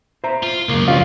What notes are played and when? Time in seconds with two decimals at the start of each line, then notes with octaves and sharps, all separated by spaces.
0.24 C5 E5 A#5
0.43 F4
0.69 C#2 F#2 A#3
0.88 F3 G3 C#4 F4 F5